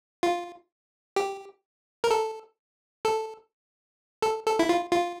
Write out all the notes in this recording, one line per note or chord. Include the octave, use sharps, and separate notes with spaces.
F4
G4
A#4
A4
A4
A4
A4
E4
F4
F4